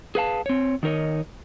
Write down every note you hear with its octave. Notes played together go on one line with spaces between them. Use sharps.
G#4 B4 F5 A5
C4 C#5
D#3 D#4 A#4 C#5 D#5